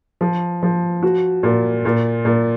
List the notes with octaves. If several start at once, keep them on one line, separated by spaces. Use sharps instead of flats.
F3
F3
F#4
A#2
A#2
A#2